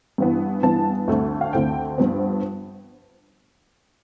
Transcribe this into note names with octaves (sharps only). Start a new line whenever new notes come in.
G2 E3 B3
G2 E3 B3 A5
D2 D3 A3 C4
F5
D2 D3 A3 C4 G5
G2 F3 B3